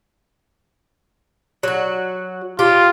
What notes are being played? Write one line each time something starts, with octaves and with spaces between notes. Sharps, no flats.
F#3 F#4
F4 G4